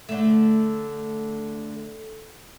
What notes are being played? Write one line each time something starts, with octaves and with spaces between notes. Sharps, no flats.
D3 A3